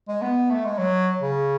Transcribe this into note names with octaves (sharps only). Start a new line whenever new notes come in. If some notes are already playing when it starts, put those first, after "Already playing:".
G#3
B3
A3
G#3
F#3
C#3